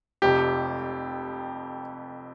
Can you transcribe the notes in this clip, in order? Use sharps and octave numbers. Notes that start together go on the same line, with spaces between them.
F1 F2 C3 G4